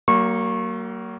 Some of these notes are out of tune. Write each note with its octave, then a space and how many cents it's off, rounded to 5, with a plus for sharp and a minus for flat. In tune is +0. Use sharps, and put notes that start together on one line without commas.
F#3 +40 A#3 -10 C#6 -25